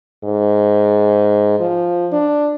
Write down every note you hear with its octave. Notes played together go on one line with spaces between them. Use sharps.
G#2
F3
D4